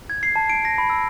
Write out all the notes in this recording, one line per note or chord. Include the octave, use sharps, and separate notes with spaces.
G#6
C7
A5
D7
A#6
B5
E6